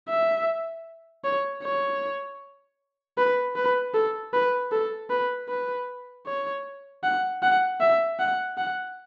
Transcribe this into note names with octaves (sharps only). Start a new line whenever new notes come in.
E5
C#5
C#5
B4
B4
A4
B4
A4
B4
B4
C#5
F#5
F#5
E5
F#5
F#5